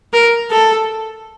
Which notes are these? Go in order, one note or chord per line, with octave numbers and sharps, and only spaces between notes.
A#4
A4